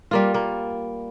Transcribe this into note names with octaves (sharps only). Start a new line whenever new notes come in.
G3 A#3 F4
A#3